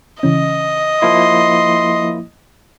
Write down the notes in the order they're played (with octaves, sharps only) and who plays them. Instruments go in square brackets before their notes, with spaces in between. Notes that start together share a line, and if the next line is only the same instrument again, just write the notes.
[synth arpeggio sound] C#3 E3 C#4 [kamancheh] D#5
[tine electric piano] F3 A#3 E4 [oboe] C6